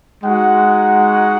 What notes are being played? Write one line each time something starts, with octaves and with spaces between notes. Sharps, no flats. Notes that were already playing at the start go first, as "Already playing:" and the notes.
G#3 D#4 F#4 F#5